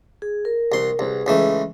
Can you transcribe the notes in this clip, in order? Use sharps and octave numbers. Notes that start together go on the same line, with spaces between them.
G#4
A#4
C2 C6
C2 G#4 B4
C#2 E3 A3